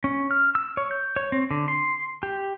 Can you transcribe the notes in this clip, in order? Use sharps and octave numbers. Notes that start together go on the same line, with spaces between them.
C#4
F6
E6
C#5
G6
C#5
C4
D3
C6
G4